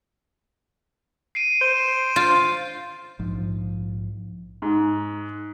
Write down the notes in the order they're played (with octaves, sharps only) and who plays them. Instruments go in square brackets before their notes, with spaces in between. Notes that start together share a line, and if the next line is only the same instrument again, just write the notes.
[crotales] C7 D7 D#7
[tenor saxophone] C5
[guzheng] F4 [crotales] G6
[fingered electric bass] A#1 G#2 F3
[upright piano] G#2